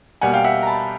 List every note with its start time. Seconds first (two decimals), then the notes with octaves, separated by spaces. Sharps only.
0.21 B2 G3 A#3 F#5 G#5
0.34 F5 G5
0.44 E5 F#5
0.62 A#5
0.67 A5 B5